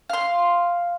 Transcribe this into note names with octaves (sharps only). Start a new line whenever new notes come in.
F5 C6